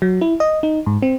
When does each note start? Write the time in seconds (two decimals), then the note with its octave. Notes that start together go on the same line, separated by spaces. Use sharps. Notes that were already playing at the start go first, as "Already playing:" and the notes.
0.02 F#3
0.21 E4
0.40 D#5
0.63 D#4
0.86 G#2
1.02 C4